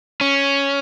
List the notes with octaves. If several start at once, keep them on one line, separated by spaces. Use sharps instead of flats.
C#4